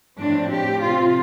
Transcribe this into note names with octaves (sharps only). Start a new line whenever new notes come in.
A2 F3 C4 D4
G4
C3 F3 C4 F4